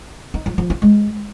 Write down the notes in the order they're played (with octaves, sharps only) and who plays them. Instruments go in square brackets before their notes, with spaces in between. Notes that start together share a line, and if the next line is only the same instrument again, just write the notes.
[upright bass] D#4
F3
F3
F4
G#3